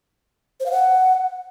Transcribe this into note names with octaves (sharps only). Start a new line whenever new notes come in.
C5
F5
F#5